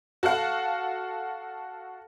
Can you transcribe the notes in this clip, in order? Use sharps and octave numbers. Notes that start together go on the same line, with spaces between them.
F#4 A4 F5 F#5